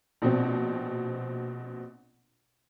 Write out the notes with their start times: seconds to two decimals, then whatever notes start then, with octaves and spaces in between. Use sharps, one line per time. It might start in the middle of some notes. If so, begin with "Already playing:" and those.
0.22 A#1 B2 C4